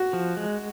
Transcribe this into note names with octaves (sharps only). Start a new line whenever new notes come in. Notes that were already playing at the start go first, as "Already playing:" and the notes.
Already playing: F#4
F3
G#3